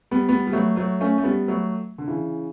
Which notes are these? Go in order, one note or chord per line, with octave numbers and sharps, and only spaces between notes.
G3 B3
G3 B3
G3
F#3 A3
F#3 A3
A3 C#4
A3
G3 B3
F#3 A3
D3
C#3 E3